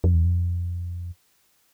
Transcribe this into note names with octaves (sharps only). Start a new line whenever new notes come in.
F2
E2
F2